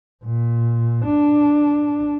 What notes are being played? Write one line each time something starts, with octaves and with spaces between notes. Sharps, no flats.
A#2
D4